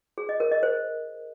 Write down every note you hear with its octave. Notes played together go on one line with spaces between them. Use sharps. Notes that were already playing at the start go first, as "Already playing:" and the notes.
G#4
D#5
A#4
D#5
C5